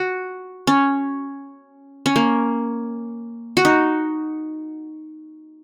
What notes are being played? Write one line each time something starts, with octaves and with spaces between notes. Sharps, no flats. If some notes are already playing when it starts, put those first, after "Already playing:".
Already playing: F#4
C#4
C#4
A#3
F#4
D#4